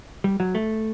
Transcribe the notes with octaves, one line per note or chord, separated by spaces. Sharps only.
G3
F#3
A3